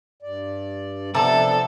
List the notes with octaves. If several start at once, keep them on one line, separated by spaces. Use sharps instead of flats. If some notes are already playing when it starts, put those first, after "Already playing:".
G2 D5
C3 F3 B3 D4 A4 A5